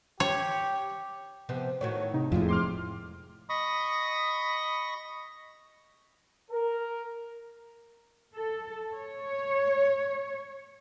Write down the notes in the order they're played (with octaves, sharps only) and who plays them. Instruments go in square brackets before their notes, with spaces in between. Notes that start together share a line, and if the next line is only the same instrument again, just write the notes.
[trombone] G4 [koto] C#5
[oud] C3 F3 B3
[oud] A2 D#3 F#4 [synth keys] C#5
[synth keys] C3 D#4
[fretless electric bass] F2 A2 [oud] C3 G#3 [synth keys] E4 F4
[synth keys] C6 D6 F6
[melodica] D#5 B5 C#6 D#6
[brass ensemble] A#4
[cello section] A4
C#5